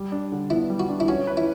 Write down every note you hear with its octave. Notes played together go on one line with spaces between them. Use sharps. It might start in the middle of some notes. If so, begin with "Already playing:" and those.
Already playing: G3 G4
D4
D3
B3 E4
G3
F#4
D4
E4
C#4 F#4
B4
E4